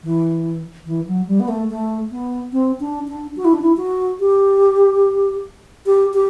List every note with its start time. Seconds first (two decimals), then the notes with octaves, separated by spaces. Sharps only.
0.03 E3
0.86 E3
1.07 F#3
1.27 G3
1.40 B3
1.48 A3
1.70 A3
2.11 B3
2.52 C4
2.80 D4
3.07 D4
3.36 F#4
3.45 E4
3.53 D4
3.61 E4
3.77 F#4
4.20 G4
5.86 G4
6.14 G4